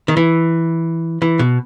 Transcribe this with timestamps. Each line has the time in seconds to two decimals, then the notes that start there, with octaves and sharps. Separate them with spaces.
0.08 D#3
0.17 E3
1.22 E3
1.39 B2